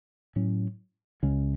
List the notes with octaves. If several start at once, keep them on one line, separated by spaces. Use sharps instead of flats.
A2 F#3 C#4
C#2 C#3 G#3 C#4